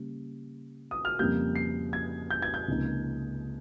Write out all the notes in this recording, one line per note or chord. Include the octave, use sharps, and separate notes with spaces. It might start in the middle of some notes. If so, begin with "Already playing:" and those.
Already playing: C#3 G3 A#3
D#6
F6
F2 C#3 G3 A#3 G6
C7
G#6
G6
G#6
G6
C#2 C3 F3 A#3 D#4